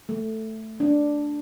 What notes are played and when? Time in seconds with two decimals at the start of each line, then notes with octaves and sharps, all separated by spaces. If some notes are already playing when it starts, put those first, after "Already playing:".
0.09 A3
0.80 D4